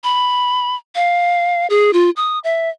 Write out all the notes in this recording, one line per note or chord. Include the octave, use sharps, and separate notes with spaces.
B5
F5
G#4
F4
D#6
E5